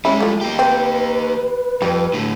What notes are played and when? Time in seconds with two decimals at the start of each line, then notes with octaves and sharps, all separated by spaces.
0.05 G3 G#3 C#4 E4
0.20 F3 A3
0.41 A#3 G4
0.59 C4 B4
1.82 F2 G3
2.13 A2 D3